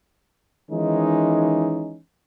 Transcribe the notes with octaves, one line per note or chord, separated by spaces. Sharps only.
D#3 E3 G#3 C#4 D#4